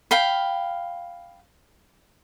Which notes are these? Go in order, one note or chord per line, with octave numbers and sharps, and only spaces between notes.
F5 G5 B5